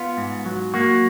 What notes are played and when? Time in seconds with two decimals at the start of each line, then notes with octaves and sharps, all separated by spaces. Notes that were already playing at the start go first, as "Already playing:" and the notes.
Already playing: B3 F4
0.17 G#2
0.45 F#3
0.74 A#3 F#4